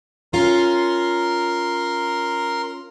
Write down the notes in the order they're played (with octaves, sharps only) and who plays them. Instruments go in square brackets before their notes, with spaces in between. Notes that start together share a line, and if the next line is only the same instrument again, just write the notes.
[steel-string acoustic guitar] C#4 F4 [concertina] A#4 C6